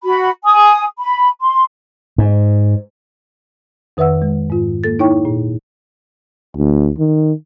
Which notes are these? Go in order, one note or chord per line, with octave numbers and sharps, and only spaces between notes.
F#4 B5
G#5 D#6
B5
C6
G#2
F2 D#3 B4 E5 F#5 E6
G#3
G#2 F4
A#3 A4 A6
D#4 E4 C#5 G5 C#6
A#2
D2
D#3